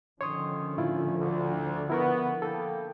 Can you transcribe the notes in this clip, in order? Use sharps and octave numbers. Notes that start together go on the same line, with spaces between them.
D3 D#3 F3 C#4 C#5 C6 D#6
A2 E4 F4
D2
B3 E4 A#4 C#6
A#3 E4 A4 G5